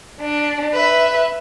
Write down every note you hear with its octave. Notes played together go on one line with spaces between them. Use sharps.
D4
B4 E5